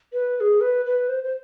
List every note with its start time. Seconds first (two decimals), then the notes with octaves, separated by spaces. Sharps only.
0.13 B4
0.37 B4
0.40 G#4
0.61 B4
0.85 B4
1.09 C5
1.24 C5